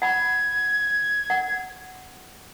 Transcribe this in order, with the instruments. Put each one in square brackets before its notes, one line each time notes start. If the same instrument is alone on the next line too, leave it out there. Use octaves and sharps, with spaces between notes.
[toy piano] F#5 B5 [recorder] G#6
[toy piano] F#5